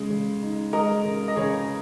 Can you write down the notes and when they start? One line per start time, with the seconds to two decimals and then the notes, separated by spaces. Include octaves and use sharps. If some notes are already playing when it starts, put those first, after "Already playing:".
Already playing: C#3 G#3
0.10 C#3
0.42 D#4
0.73 G#3 A#4 D#5
1.05 C#3
1.28 D#5
1.36 C#3 G#4 C#5